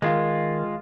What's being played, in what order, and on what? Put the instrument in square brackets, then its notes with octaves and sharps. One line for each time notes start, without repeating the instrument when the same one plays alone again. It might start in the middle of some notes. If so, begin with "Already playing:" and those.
[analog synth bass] D#3 [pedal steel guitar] G#3 F4